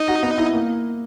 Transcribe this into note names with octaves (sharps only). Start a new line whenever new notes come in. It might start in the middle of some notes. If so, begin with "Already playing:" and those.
Already playing: D#4 D#5
F#4
B3
E4
A#3